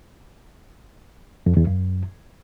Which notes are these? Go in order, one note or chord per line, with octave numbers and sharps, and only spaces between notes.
F2
E2
F#2